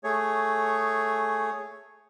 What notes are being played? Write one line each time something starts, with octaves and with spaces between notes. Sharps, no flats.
A3 G#4 C#5